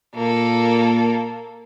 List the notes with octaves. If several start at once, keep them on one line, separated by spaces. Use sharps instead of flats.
A#2 A#3 A4